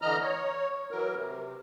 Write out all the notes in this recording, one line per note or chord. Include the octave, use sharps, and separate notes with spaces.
D3 E3 D#5 A#5 F6
C#5
E3 F#3 A#4
C3